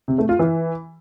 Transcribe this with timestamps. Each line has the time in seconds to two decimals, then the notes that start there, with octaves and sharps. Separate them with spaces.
0.08 C3
0.18 A3
0.29 F4
0.39 E3